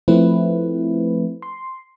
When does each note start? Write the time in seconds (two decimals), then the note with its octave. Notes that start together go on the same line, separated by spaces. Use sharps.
0.08 F3 A3 C4 E4 B4
1.42 C6